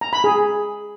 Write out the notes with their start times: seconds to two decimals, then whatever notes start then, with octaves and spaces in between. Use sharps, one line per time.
0.01 A#5
0.13 B5
0.24 G#4